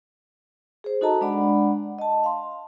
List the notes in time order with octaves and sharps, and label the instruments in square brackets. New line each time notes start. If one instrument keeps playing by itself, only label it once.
[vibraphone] G#4 C5
D#4 F#4 A4 D#5 A5 A#5
G#3 D4 D5 F#5 B5
D#5 A5
F5 C6